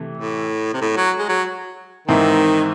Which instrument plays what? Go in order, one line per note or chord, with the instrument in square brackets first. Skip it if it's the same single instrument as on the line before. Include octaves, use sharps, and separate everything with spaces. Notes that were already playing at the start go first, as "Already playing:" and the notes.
Already playing: [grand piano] C3 E3 A3
[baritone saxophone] A2
C3
A2
F#3
G#3
F#3
[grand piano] G#2 E3 C4 E4 [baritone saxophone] D#3